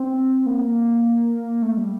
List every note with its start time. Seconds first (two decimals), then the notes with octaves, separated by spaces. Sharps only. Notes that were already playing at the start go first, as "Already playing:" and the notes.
Already playing: C4
0.46 A#3
1.62 A3
1.77 G3